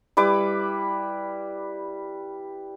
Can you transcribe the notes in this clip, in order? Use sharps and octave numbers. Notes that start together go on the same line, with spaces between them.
G3 E4 B4 D6